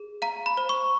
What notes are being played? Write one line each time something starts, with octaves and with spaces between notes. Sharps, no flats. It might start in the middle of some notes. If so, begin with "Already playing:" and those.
Already playing: G#4
F5 A#5
B5
C5
C#6